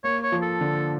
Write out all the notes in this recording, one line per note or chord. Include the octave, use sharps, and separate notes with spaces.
A#3 C#5
C#5
F3
A4
D3